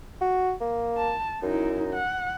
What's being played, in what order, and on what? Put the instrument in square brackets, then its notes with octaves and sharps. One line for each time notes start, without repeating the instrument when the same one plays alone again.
[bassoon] F#4
A#3
[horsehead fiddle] A5
[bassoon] F#2 [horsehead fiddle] D#4 E4
[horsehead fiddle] F#5